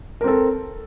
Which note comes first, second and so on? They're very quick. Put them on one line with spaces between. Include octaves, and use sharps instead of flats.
A#4 C4 A4